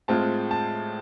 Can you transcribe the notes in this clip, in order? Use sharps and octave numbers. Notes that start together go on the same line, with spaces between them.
A2 G#3 C4 F4 A5
A5